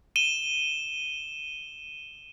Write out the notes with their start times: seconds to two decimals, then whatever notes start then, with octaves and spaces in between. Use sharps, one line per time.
0.16 D#7 E7 G7